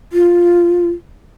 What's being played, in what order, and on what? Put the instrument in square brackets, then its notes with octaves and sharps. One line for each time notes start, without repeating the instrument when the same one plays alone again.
[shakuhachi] F4